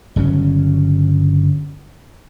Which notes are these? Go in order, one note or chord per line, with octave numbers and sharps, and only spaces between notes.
G1 C#3 F#3 C#4